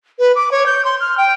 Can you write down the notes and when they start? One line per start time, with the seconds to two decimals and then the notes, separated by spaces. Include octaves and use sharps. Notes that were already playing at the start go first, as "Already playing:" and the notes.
0.19 B4
0.35 D6
0.51 C#5
0.66 G6
0.85 C6
1.00 F6
1.17 G5